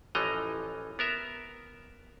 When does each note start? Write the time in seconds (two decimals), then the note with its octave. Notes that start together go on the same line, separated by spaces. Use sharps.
0.15 A1 E3 F3 D#5 A#5
0.99 B3 A#4 E5